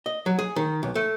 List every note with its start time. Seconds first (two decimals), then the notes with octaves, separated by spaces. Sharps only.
0.06 D#5
0.26 F#3
0.39 G#4
0.56 D#3
0.83 B1
0.95 A3